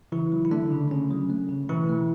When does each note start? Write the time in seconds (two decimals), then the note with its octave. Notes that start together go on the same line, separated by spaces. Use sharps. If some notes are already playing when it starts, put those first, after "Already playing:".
0.12 C#3 E3 E4
0.32 F#3
0.45 E4
0.51 D3 A3 D4
0.72 C#3
0.91 C#3 C#4
1.11 F#3
1.30 A3
1.49 C#3
1.69 B2 E3 E4
1.89 A3